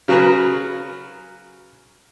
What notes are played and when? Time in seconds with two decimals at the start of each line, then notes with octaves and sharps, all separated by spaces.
0.08 C#3 F#3 F#4 G#4 A#4 B4